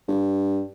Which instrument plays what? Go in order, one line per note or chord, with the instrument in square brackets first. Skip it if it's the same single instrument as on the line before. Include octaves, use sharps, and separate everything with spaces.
[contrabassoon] G2